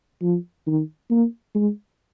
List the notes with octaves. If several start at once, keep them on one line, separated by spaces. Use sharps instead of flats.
F3
D#3
A#3
G#3